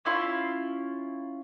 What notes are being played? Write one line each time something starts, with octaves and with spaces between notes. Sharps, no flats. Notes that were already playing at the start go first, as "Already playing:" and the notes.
C#4 E4 F4 C6